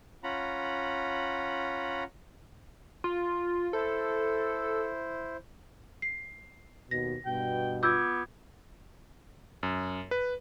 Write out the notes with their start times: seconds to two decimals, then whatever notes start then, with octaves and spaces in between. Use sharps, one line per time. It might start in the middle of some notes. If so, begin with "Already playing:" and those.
0.24 C#4 F4 F#5 A#5 B5
3.04 F4
3.73 E4 A4 C5
6.02 C7
6.91 D#2 B2 A#6
7.26 G2 B2 G5
7.83 B3 F4 D6 E6 G6 G#6
9.63 F#2
10.11 B4